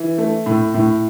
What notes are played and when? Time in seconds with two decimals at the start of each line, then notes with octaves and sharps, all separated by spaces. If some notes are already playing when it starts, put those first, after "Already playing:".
Already playing: E3
0.18 A3
0.46 A2
0.74 A2